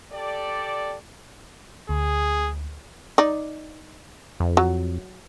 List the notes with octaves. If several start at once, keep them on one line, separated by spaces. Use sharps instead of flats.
G4 A4 D5
D2 G#4
D#4 D5
F2
F#3